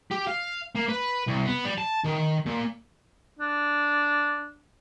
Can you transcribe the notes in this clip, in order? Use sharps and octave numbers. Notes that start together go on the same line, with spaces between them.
G4
F5
A#3
B4
C2
B3
G3
A5
D#3
A#2
D4